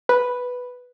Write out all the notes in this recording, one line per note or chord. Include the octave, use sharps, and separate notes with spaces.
B4